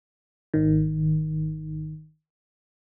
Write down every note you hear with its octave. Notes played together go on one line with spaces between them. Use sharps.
G#1 D#3